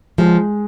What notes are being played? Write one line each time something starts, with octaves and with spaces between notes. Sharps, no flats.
F3 G#3